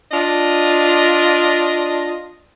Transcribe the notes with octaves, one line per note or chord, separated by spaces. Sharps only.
D4 F4 D#5